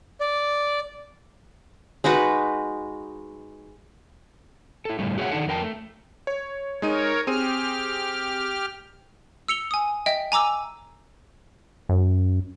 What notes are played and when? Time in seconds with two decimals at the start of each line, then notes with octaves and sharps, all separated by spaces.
0.21 D5
2.04 G#3 D#4 F#4 B4
4.85 E4 A4
4.99 A2 D3 G3 A3
5.18 F#4 G#4 C#5 D5 E5 F#5
5.32 D#3 B3 D4 D#4 A4 F#5
5.48 F2 A#4 G5 A5
5.62 A3
6.27 C#5
6.82 G#3 D#4 A#4 C#5 D#7
7.27 C4 G4 G#4 F6 D#7
9.48 E6 C#7 F7 G7
9.71 G#5 D#6
10.06 D#5 E5 G5
10.32 G#5 A#5 D6 E6
11.89 F#2